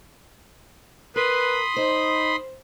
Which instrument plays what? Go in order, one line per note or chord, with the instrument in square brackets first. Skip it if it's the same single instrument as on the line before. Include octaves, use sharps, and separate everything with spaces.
[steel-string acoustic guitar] A#4 [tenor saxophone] B4 [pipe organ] B5 C6 D#6
[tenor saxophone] D#4 [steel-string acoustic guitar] C5